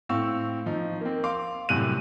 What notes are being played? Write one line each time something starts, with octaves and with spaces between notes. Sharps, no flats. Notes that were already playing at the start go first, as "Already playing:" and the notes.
A2 C4 F5 C#6 E6
F3 D#4
A#3 C4
F5 C6 D6
F#2 A2 C3 G3 F#6 D#7